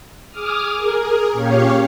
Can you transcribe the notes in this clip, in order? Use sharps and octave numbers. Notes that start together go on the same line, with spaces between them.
G#4 D6 D#6 F6
G#4 A#4
A#2 C#4 G4 C#5 F5